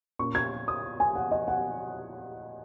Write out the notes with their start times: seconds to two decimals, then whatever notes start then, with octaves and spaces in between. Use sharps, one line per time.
0.19 A#2 A#3 C#4 C#6
0.35 G#6
0.68 D#6
1.00 G#5
1.15 F#5
1.31 D#5
1.48 F#5